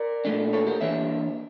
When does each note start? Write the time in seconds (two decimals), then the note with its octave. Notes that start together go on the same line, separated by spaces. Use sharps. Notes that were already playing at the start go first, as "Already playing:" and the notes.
Already playing: A#4 D5
0.25 A#2 A3 D4
0.53 A4 C#5
0.67 G4 A#4
0.81 E3 A#3 D4 C#5 E5